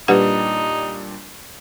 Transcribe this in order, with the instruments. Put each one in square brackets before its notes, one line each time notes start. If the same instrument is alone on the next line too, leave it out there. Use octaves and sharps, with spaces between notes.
[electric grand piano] A#2 G3 D4 [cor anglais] D#4 [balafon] G4 B4 F#5